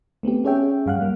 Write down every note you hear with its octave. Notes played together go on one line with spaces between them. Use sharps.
A3 B3 C4 G4
C#4 G#4 C#5 E5 G5
G2 G3 F5 F#5 F#6
G3 A#3